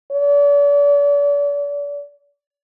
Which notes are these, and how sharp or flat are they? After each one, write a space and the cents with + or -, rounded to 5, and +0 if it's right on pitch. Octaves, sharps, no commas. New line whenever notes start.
D5 -40